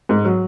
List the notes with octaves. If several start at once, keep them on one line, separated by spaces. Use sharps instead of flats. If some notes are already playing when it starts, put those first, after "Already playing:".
G#2
F#3